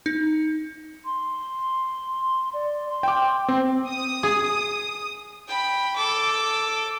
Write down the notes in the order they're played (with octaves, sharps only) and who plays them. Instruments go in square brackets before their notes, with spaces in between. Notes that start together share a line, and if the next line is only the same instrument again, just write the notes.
[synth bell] D#4
[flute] C6
D5
C6
[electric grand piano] G5 D6
[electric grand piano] C4 [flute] G5
[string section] D#6
[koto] G#4
[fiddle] G5 B5
A4 D6